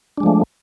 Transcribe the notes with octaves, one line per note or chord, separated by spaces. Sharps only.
F3 G#3 A3 D4